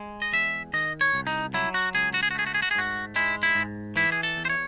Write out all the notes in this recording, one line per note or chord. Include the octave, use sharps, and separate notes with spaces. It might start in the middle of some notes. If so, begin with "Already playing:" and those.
Already playing: G#3
D#5
E2 E5
D#3 D#5
C#5
C2
D#4
F#3 E4
F#4
C#2 G#4
F#4
G#4
F#4
A3 G#4
F#4
G#4
F#4
G#4
G#2 F#4
G#3 E4
E4
G#2
E3 E4
G#4
A4
E2
C5
C#5